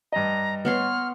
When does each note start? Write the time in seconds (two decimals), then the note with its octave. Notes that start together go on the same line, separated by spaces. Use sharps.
0.12 G2 D#5 A#5
0.65 B3 C#5 C6 F6